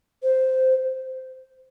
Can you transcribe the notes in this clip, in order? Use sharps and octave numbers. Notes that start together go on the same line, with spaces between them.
C5